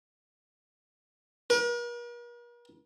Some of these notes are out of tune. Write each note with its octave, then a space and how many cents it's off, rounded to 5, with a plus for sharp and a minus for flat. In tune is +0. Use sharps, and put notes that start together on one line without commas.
A#4 +45